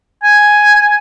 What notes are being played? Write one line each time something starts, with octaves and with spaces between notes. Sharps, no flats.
G#5